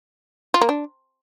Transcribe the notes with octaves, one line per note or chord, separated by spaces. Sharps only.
F4
A#3
D4